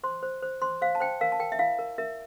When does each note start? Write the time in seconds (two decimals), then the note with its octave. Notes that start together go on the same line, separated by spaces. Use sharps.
0.03 C5 C6
0.23 C5
0.42 C5
0.62 C5 C6
0.81 C5 F5
0.95 A5
1.00 C5 G5
1.21 A#4 F5
1.32 A5
1.40 A#4 G5
1.52 E5
1.59 E4 F5
1.79 A#4
1.98 A#4 E5